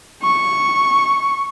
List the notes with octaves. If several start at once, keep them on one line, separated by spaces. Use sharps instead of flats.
C#6